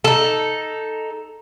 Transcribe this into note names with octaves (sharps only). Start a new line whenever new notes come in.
D#4 A4